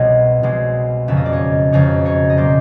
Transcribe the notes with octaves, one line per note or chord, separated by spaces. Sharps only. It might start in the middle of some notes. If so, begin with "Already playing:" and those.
Already playing: C2 B2 G#3 C#5 D#5
C2 B2 G#3
F#1 F2 C#3 E5
D#5
D5
C#5 D#5
F#1 F2 C#3 C#5 D#5
C#5 D#5
D#5
B2 F#3 A#3 C5 D5